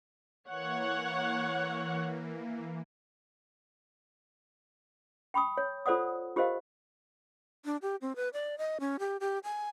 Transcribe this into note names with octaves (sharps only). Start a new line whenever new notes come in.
E3 A#3 C#5 F#5
G5 B5 C#6 D#6
C#5
F4 A4 C5 D5 F#5 D#6
F4 G4 A#4 C5 D#5 F5
D4
G4
C4
B4
D5
D#5
C#4
G4
G4
G#5